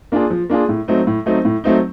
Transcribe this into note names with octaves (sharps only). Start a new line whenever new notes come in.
A#3 D4 F4 G#4
F3
A#3 D4 F4 G#4
A2
F#3 A3 C4 D#4
A2
F#3 A3 C4 D#4
A2
F#3 A3 C4 D#4